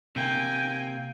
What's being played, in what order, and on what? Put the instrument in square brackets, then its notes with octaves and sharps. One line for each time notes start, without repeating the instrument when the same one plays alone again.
[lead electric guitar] C3 A#3 [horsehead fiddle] G5 G#5